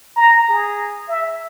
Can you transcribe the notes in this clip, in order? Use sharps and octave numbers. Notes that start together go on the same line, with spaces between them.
A#5
G#4
E5